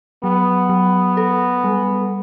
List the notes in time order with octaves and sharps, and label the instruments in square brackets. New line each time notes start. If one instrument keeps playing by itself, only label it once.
[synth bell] F#3 [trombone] B3
[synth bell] F#3
A4
G3